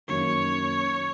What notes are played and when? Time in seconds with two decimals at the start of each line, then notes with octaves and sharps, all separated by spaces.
0.08 F#2 D#3 F#3 A#3 D#4 C#5